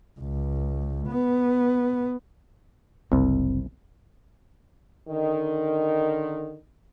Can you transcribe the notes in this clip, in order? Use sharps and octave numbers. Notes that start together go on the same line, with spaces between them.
C#2
B3
F#1 C2 C4
D3 D#3